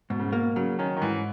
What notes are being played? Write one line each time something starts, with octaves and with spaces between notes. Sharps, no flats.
G#2 B2
C#3
B2 A#3
C#3 F#3
D#3 C#4
D#3
G#2 E3